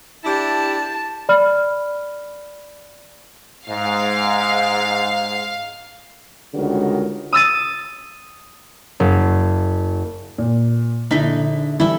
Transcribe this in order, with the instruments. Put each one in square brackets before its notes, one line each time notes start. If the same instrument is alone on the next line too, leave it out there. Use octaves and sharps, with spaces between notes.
[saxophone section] D4 E4 G4 [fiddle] A5
[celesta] D5 B5 F6
[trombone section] G#2 [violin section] F5
[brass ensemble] C#2 D3 D#3 G3 F#4 A#4
[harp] D#6 E6 A6 D#7
F#1
[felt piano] A#2
[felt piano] A#1 E4 B6 [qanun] D3 D#4
[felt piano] E3 G3 [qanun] E4 A4 E5